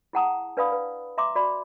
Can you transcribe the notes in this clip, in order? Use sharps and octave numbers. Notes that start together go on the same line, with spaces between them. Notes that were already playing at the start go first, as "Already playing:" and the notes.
E4 G#4 F#5 A5 A#5 D#6
D4 B4 D5 F5 B5 D#6
B4
E5 A#5 C6 D6
F#4 D5 B5